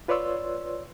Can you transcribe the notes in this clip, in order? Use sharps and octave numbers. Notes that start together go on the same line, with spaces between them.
F4 B4 C#5 D5 C6 E6